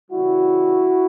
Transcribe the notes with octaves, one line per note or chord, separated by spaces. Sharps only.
C#3 E3 G3 E4 F#4